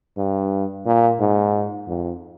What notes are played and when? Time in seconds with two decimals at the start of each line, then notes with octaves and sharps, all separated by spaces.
0.17 G2
0.86 A#2
1.20 G#2
1.87 F2